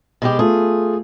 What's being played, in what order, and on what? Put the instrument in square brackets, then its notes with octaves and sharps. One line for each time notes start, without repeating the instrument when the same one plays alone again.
[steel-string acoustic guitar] B2 G#3 G4
[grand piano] A3 F4 [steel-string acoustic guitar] G#4